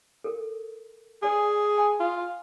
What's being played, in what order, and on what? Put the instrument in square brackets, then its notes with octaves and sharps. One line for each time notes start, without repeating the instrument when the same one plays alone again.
[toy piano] A4 A#4
[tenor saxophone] G#4 [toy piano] B4 D5 G#5
[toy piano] G#5 A5
[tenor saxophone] F4